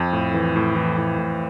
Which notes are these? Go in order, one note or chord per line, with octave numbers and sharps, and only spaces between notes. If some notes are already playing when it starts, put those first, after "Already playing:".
Already playing: F2
A2
E3
A2
E3
A2
A2